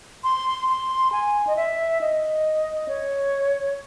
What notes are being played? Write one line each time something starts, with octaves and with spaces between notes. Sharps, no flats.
C6
C6
G#5
D#5
E5
D#5
C#5